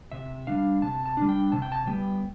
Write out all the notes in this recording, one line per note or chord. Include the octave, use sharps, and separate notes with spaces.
C3 E5
G3 D4 F5
C3 A5
A5
G3 D4
G5
C3 A5
G5
A5
G3 B3 G5